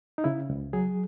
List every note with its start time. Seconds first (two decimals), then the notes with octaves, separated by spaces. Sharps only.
0.18 D#4
0.24 C#3 E4
0.50 C#2
0.73 F#3 G#4